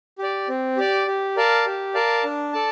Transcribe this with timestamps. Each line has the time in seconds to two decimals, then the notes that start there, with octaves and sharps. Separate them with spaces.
0.18 G4 D5
0.49 C4
0.77 G4 D5
1.07 G4
1.37 A#4 D5 F5 A5
1.66 G4
1.94 A#4 D5 F5 A5
2.24 D4
2.53 A4 D5 A5